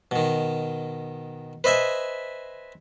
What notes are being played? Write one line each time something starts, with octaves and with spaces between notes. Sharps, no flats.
B2 D#3
B4 C5 D#5 E5 G#5